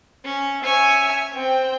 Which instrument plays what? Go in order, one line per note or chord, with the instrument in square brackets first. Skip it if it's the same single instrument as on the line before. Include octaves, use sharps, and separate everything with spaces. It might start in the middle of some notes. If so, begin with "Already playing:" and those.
[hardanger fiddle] C#4
[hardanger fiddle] C#4 C#5 [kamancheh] E5 G#5
[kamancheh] C4 G5